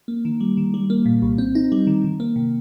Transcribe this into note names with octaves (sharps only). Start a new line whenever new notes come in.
A#3
D#3
G3
D#3
G3
A#3
A#2
C2
C4
D#4
G3
D#3
D#3
A#3
C3